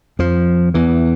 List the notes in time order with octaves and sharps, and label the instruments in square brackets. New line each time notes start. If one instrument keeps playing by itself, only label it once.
[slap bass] F2 F3
E2 E3